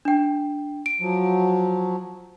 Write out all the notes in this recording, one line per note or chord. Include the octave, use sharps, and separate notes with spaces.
D4 G5
D7
F3 F#3